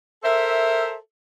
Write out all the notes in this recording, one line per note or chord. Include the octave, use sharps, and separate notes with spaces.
A4 A#4 C5 E5